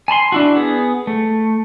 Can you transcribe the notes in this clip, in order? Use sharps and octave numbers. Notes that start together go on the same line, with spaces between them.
G#5 A5 B5 C6
D4 E4 F#4
B3 G#4
A3